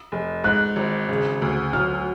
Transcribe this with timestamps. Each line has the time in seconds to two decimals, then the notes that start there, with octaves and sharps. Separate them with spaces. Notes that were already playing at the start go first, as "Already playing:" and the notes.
0.12 F1
0.44 G#2 F#6
0.76 G#1
1.08 C#3
1.42 D2
1.73 F#3 F6